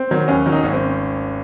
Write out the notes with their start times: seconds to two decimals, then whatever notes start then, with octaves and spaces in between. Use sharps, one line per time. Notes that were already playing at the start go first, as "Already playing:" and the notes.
Already playing: C4
0.11 D#3 F#3
0.28 D#2 C#4
0.46 D#3 F#3
0.52 D#4
0.64 G#1 C#4
0.73 C4